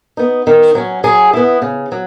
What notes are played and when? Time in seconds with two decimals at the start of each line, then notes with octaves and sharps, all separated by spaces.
0.17 B3 D#4
0.47 D#3
0.75 F#3 C#4
1.04 F#3 G#4
1.33 B3 E4
1.62 C#3
1.92 F#3